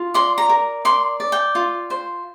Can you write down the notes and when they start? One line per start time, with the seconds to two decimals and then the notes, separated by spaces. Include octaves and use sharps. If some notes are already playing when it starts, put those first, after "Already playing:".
Already playing: F4
0.14 D5 C6
0.38 A#5
0.49 A#4
0.85 D5 C6
1.20 D5
1.32 G5
1.55 F4
1.90 C5